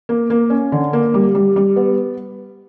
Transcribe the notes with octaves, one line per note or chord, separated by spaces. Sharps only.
A#3
A#3
C#4
D3
A#3
G3
G3
G3
B3